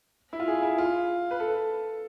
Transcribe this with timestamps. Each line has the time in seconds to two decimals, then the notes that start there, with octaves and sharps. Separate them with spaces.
0.33 E4
0.40 F4
0.48 G#4
0.63 E4
0.78 F4
1.31 B4
1.40 A4